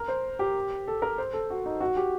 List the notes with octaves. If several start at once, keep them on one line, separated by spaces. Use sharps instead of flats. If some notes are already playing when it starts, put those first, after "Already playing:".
Already playing: A#4
C5
G4
A4
A#4
C5
A4
F#4
D#4
F#4
G4